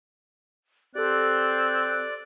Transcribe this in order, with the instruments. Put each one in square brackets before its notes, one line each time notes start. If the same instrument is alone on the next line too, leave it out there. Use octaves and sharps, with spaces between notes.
[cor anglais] C4 [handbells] G4 A4 [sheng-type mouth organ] D5 [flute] F#6